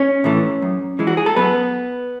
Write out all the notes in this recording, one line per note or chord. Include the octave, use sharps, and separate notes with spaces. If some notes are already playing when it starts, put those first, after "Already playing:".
Already playing: C#4 C#5
A2 E3 A3
F#2
E3 G#3
F#4
G#4
A4
F#2 B3 B4